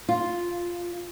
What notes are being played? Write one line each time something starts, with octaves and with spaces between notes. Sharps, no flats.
F4